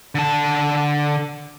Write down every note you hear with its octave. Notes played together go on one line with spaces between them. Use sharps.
D3 A5